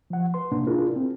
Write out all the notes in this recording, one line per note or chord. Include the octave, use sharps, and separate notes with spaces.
F3 F#5
B4 C6
A2 C3 A#3 C#4 D4
D4 E4 F4 G#4 A#4
C4